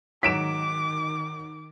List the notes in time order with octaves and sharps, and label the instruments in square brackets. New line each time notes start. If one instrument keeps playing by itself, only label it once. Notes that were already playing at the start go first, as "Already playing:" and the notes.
[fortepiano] G#2 F#3 [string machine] D#3 [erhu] D6 [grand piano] B6 D7 E7